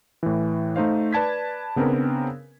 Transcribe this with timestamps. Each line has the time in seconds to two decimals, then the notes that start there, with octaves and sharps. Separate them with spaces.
0.23 A2 E3
0.76 A3 D#4 C5 F5
1.13 B4 D5 A5 G#6 B6
1.76 C#3 B3 C4 D4 A#4